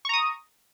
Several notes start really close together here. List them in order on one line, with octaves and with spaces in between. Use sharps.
C#6 A#5 D#6